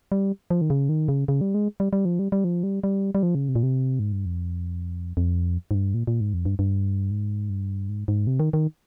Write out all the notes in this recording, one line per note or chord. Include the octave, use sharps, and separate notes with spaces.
G3
F3
D#3
C#3
D#3
C#3
C#3
G3
G#3
G3
G3
F3
G3
G3
F3
G3
G3
G3
F3
C#3
C3
A#2
C3
G#2
G2
F2
F2
G#2
G2
A#2
A#2
G#2
F2
G2
G2
G#2
G2
G#2
G#2
C3
D#3
D#3